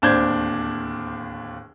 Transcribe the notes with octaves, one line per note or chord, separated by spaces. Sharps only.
D1 D#2 D4 C5 G6 G#6